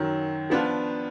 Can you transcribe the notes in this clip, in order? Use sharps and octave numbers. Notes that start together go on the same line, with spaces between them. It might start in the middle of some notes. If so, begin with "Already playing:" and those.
Already playing: F#2 D#3 F#3
F3 B3 D4 F4